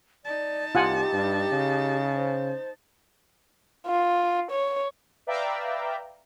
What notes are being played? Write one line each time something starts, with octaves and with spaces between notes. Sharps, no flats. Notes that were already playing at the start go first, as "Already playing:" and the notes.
D#4 D5 A5
C2 F4 G4 F#5 G#5
G2
C#3
C5
F4
C#5
B4 D5 E5 F5 G5 A#5